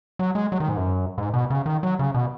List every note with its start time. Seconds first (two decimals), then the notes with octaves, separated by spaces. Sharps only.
0.19 F#3
0.35 G#3
0.52 F#3
0.60 D#3
0.69 G#2
0.77 F#2
1.18 G#2
1.34 B2
1.50 C#3
1.66 D#3
1.83 F#3
1.99 C#3
2.14 B2